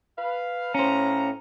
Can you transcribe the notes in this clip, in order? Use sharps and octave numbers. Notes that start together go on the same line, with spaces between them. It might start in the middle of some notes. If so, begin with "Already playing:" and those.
B4 F5
A2 C#4 C5 F5 A#5